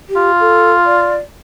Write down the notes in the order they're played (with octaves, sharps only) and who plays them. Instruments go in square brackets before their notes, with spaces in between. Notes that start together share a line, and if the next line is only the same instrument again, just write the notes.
[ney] G4
[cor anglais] F4
[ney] A4
D5